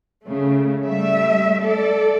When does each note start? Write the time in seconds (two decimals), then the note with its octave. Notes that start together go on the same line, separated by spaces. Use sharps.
0.23 C#3 A3
0.85 G3 A3 E5
1.62 A4 D5